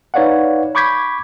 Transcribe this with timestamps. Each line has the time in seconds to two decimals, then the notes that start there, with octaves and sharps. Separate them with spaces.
0.14 D#4 B4 C#5 D5 F5 F#5
0.75 B5 C#6 D6 G6 G#6 B6